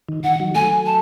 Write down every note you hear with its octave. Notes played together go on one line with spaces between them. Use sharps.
D#3
D#3 F#5
D#3 F#3
F#3 A3 G#5
A5